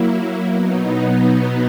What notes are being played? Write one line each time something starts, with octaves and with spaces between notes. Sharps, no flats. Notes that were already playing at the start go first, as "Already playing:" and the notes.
Already playing: F#3 A#3 E4
B2 F#3 B3 D#4